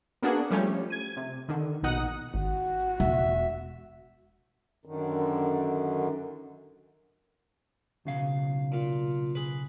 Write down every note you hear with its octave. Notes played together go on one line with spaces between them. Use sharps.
A#3 B3 D4 F#4 G#4 F#5
F3 G3 A3 C#4
G#6 D#7
C3
D3 D#3
A#1 B2 D#4 F#5 D#6
G#1 F#4
E1 E5
F#2 D3 D#3
B1 C#3 F5
A#2 F4
G#4 B4